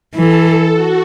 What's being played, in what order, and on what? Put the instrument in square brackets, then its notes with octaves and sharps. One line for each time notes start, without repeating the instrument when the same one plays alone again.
[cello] E3 [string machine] A4
[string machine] F#4